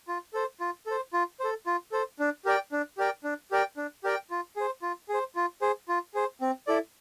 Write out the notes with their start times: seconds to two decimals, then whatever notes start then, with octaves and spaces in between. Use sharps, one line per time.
0.08 F4
0.34 A4 C5
0.60 F4
0.86 A4 C5
1.13 F4
1.40 A4 C5
1.66 F4
1.92 A4 C5
2.19 D4
2.45 G4 A#4 D5 G5
2.72 D4
2.98 G4 A#4 D5 G5
3.24 D4
3.51 G4 A#4 D5 G5
3.77 D4
4.04 G4 A#4 D5 G5
4.31 F4
4.56 G#4 C5
4.82 F4
5.09 G#4
5.14 C5
5.36 F4
5.62 G#4 C5
5.88 F4
6.14 G#4 C5
6.41 C4
6.67 E4 A4 D5